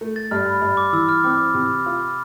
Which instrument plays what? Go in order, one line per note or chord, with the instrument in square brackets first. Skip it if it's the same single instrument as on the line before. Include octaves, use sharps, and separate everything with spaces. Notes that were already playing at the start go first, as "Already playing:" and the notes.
[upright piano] A3
[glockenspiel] A6
[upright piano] G2 [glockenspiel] F6
[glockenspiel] B5
[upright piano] G2
[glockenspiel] D6
[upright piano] E3 [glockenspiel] E6
[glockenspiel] F6
[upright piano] C4 [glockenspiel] D6
[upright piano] C3
F4